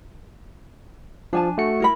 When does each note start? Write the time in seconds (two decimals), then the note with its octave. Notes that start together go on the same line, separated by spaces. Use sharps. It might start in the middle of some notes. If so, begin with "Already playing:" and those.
1.33 F3 D4 G#5 A5
1.58 A3 F#4 C#7
1.80 E4 A#4 B5